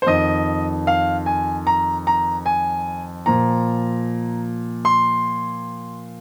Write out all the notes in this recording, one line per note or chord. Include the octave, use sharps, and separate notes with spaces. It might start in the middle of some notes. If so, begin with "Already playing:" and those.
C5
F2 D#3 D#5
F5
G#5
A#5
A#5
G#5
A#2 F3 A#5
C6